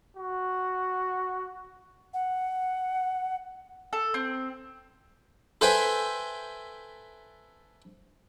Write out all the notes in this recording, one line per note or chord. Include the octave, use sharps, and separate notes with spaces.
F#4
F#5
A4
C4
A4 B4 C5 E5 G5 G#5